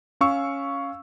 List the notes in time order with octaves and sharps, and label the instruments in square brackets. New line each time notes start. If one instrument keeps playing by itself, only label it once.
[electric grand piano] C#4 F5 C#6 E6